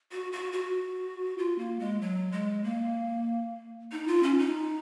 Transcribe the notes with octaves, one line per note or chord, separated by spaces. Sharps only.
F#4
F#4
F#4
F4
A#3
G#3
F#3
G#3
A#3
D#4
F4
C#4
D#4